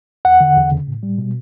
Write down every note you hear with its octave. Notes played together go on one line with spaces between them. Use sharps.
E2 F#5
D3
E2
C#3
A2
G3
B2